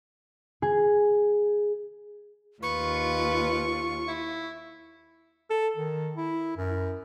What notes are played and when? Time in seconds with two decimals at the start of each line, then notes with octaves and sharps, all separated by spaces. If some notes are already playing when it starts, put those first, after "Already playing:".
0.62 G#4
2.63 D#2 F4 B4 C#6
4.08 E4
5.50 A4
5.77 D#3
6.16 E4
6.57 F#2